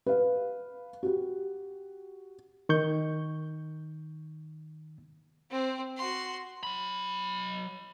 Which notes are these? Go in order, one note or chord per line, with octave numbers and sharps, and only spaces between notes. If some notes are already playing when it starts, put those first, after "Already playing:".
B4 F5
F#4 G4
D#3 C#6 G6
C4 C5
F#4 C6
F#3 B5